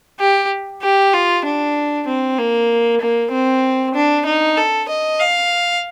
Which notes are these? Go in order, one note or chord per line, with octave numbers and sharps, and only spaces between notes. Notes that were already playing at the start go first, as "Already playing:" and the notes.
G4
G4
F4
D4
C4
A#3
A#3
C4
D4
D#4
A4
D#5
F5